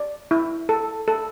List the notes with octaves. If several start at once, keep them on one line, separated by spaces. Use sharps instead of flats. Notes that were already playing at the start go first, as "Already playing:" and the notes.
Already playing: D5
E4
A4
A4